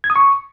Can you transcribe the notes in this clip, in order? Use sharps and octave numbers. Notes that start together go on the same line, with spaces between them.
G#6
D#6
C#6